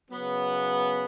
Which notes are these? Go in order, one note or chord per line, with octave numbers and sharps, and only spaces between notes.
C#3 F#3 B3